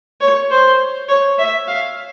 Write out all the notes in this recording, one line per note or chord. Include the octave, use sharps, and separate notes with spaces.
C#5
C5
C#5
E5
F5